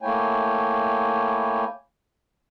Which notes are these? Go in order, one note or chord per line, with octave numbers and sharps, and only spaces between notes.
A3 A#3 E4 C#5 G5 G#5